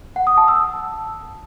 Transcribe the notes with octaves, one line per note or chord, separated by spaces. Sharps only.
F#5
D#6
A5
E6